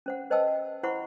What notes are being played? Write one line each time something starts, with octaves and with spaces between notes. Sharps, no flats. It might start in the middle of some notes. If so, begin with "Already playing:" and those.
C#4 C5 F#5
B4 C5 D#5 G5 A5 E6
F#5
E4 C5 F#5 B5 C#6